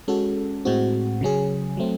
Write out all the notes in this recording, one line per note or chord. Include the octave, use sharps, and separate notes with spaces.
G#3 C#4 F#4 A4
A2 G#3 C4 F#4
C#3 F#3 C#4 G#4
F#3 A3 C4